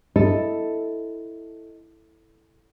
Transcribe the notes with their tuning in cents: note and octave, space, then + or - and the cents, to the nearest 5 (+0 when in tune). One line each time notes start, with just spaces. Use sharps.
E4 +0 A4 +5 D#5 +0